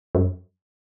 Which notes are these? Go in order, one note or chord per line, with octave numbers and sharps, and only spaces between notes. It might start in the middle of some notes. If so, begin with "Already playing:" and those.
F#2